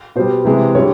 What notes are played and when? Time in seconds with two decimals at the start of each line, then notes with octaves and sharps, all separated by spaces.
0.16 B2 G3 C5
0.45 C3 E3 G#3
0.75 D3 G3 C#5